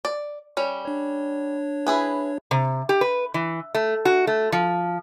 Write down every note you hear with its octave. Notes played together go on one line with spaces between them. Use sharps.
D5
G3 C#4
D4 C#5
E4 G#4 B4
C3
G4
B4
E3
A3
F#4
A3
F3